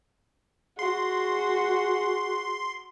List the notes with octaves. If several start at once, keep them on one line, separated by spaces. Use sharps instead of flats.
F#4 G#4 C6